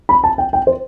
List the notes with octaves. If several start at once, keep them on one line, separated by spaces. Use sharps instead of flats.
B5
A5
G5
G5
C5